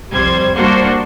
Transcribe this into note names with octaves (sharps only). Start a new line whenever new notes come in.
C2 F2 G3 C5 G#6
G3 A#3 D4 F#4 C5